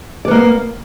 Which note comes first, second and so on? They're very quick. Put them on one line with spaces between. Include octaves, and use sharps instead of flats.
D5 B3 A#3